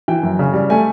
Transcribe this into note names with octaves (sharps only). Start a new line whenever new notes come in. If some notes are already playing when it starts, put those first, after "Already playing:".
E3 G5
F#2
C#3
G3
A3 G#5